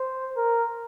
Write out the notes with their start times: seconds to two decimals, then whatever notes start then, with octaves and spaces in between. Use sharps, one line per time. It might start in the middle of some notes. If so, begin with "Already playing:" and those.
Already playing: C5
0.37 A#4